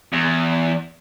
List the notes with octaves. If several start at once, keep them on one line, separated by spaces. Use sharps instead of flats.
E2